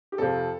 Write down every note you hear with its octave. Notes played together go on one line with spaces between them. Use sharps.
G4
F2 C3 F3 A4